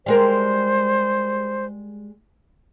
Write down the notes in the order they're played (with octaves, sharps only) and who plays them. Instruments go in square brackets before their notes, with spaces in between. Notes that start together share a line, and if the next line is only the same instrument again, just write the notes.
[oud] G3 G#3 A#4 [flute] C5